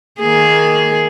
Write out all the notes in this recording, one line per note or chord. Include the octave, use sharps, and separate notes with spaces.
D#3 A#3 G#4